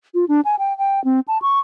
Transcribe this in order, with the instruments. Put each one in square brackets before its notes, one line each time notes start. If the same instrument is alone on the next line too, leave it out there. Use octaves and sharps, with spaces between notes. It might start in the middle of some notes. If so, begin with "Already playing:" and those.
[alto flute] F4
D4
G#5
G5
G5
C4
A5
C#6